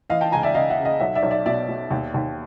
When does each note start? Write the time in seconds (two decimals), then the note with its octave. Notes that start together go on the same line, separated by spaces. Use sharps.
0.10 E3 D#5 F5
0.21 G5 A5
0.32 C#2 G#5 A#5
0.43 D5 E5
0.55 C#2 D#5 F5
0.70 E5 F#5
0.78 C#3
0.85 D#5 F5
1.00 B1 E5 F#5
1.15 D5 E5
1.23 B1
1.31 D5 E5
1.45 B2 D5 E5
1.68 B2
1.91 D#2
2.14 D#2